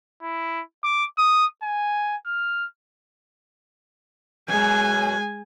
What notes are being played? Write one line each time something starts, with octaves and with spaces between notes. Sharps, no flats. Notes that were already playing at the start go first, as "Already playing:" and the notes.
E4
D6
D#6
G#5
F6
F#2 B2 G#3 G#5